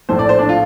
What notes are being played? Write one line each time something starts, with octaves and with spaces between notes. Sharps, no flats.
A#1 A2 A3 C5
D5
C5
D4
F4